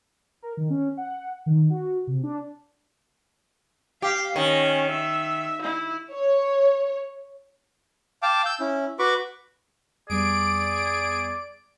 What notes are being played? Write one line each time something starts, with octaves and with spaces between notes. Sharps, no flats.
A#4
D#3
C#4
F#5
D#3
F#4
C3
D4
G4 F5
D#3 C#4
E5
E4
C#5
F5 G5 A5 D6
E6 G6
C#4 E4
F#4 B4 B5 C#6 D6
F2 G3 B3 G#4 D5 D7